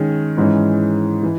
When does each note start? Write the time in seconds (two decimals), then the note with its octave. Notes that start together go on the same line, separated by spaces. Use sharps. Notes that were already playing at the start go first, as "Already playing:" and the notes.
Already playing: D#3 G#3 C#4 G#4
0.37 G#2 E3 G#3 C#4
1.23 E3